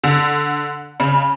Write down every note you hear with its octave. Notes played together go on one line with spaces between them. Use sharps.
D3
C#3